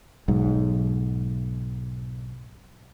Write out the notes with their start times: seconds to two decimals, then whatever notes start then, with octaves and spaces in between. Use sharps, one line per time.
0.28 B1 G#2